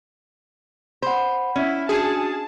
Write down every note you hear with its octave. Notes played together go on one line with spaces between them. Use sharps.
C5 F#5 B5
C#4 E4
D4 F#4 G#4 A5 C#7